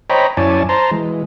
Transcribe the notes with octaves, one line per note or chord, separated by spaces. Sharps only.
C5 C#5 D#5 G5 A#5 B5
F#2 E4 C#5 D5 G#5 A5
C5 A5 A#5 C6
E3 G#3